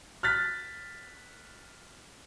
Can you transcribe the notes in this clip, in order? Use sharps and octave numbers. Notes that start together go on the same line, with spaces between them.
F6 F#6 A6 B6